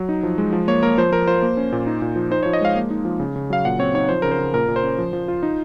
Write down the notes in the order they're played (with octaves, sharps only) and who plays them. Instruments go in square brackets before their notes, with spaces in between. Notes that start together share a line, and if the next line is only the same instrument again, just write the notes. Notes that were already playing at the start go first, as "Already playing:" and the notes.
Already playing: [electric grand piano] F#3
D#4
F3
G#3
F3
A#3 C#5
A#3 A#4
F3 C5
F3 A#4
F4 C5
A#3
C#4
A#2
D#4
A#2
F3
D#4 C5
C#5
F3
D#5
G#3 F5
A#3
D#4
F3
C#3
C#3
F#3 F5
A#2 F#5
C4 C#5
D#4 C#5
F3 C5
C#3 A#4
C5
C#3
A#2 A#4
A#2
C5
C#4
F3
F3
F4
D#4